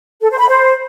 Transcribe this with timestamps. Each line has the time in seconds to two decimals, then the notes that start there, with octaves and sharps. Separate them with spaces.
0.22 A4
0.31 C5
0.39 B5
0.48 C5